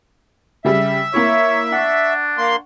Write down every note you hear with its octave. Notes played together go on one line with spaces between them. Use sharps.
C#3 G3 E5
A#3 E4 C#5
D4 F#5 C#6
A#3 C6